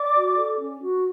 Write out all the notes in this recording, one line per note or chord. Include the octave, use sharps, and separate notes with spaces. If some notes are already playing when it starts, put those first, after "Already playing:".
Already playing: D5 D6
F#4
A4
C#4
F#4